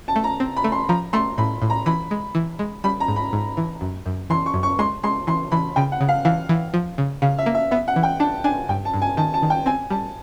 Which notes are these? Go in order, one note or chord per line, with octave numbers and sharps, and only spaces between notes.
A5
A3
A#5
C4
B5
A3
C6
F3 A#5
A3 C6
A2 B5
A2
A#5
E3 B5
G#3
E3
G#3
G3 B5
A#5
G#2
B5
G#2
E3
F#2
F#2
E3 C6
C#6
F#2
C#6
G#3 C6
G#3 C6
E3 C6
E3 B5
C#3 G5
F#5
C#3
F5
E3 F5
E3
F3
C#3
C#3 F5
E5
A#3
E5
B3 E5
F#5
E3
G5
D4 A5
D4 G#5
G2 G5
A5
G2
G#5
D#3 A5
A5
D#3
G5
C4 G#5
G3 A5